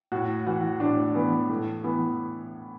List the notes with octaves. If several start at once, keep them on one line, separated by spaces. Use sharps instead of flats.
A2 F#4
E3 F#4
A2 D4
E3 B3
A2 A3
E3 B3